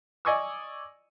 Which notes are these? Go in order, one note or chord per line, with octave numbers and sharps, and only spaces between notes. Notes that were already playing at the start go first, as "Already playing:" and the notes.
D5 D#5 G#5 C#6 D#6 E6